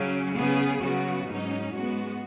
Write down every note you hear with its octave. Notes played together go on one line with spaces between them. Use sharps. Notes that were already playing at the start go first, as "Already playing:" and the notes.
Already playing: C#3 F#3 C#4
C#3 B3 G#4
C#3 F#3 B3 F#4
G#2 F#3 C#4 D#4
G#2 G#3 B3 F#4